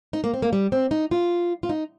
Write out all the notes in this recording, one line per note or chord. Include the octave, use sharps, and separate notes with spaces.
D#4
A#3
C4
A#3
G3
C4
D#4
F4
F4
D#4